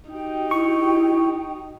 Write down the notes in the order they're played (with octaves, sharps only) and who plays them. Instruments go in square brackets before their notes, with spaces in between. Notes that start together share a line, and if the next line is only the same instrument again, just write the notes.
[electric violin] D#4 [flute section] F#4 G4 G5
[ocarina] E4 [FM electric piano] C#6